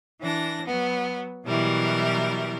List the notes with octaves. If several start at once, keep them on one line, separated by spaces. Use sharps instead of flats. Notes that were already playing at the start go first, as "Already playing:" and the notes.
E3 D4 A#6
F#3 B3
B2 E3 F#3 G3 E4 A#4